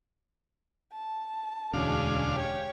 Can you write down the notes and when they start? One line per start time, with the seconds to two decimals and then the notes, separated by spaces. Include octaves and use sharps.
0.93 A5
1.73 E1 D2 G#3 C#4 D4 F5
2.33 G4 C#5